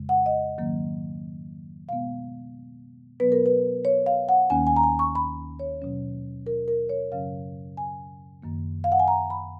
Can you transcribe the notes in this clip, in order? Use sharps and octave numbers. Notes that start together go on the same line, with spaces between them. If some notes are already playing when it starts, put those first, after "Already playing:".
Already playing: F2 C#3 G#3
F#5
D#5
G#2 D#3 F#3 A#3 C#4
B2 G#3 B3 F5
B2 F#3 B3 B4
A#4
B4
C#5
F5
F#5
D#2 D#3 A#3 C#4 G#5
G#5
A#5
G#5
C#6
B5
C#5
B2 F#3 C#4
A#4
A#4
C#5
F#2 C#3 F#3 C#4 F5
G#5
F#2 D#3 A#3
F5
F#5
G#5
A#5
B5